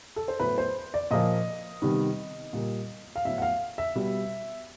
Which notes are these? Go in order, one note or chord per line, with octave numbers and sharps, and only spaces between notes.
A4
C5
A2 F#3 B3 B4
C5
D5
A#2 F3 A#3 D#5
C3 D#3 G3 B3
A#2 G3 A#3
F5
A2 F#3 B3 E5
F#5
F5
E5
B2 G3 B3